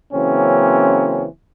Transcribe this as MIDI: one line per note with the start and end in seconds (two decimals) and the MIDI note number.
0.13 1.26 49
0.13 1.26 52
0.13 1.26 54
0.13 1.26 58
0.13 1.26 60
0.13 1.26 61